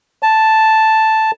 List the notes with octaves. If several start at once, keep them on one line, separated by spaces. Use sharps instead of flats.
A5